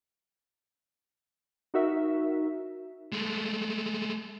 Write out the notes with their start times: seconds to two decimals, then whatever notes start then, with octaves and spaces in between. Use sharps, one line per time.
1.74 D#4 F#4 A#4 E5
3.12 G#3 A3